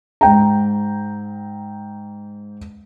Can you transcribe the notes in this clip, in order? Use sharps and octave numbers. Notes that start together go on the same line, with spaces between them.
G#2 G5 A#5